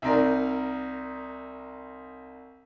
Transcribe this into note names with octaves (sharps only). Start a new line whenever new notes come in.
C2 C3 D#4 A#4 D5